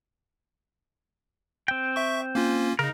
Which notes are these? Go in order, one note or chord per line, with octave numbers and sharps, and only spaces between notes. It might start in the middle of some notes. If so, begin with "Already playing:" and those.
C4 G5
E5 C#6
A#3 C#4 F4
C#3 D#4 A#4